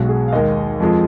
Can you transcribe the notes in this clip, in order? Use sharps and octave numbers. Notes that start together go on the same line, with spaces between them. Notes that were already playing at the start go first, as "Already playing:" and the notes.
Already playing: B1 B2 G#3 F#4
G#4
F5
D#2 D#3 G#3 D#5
F2 F3 G#3